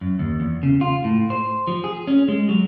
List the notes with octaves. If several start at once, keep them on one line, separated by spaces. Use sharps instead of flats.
F#2
D#2
E2
C#3
F4
A2
C5
F3
G#4
C#4
G#3
F#3